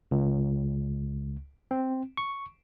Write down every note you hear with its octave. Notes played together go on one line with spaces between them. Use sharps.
C#2
C4
C#6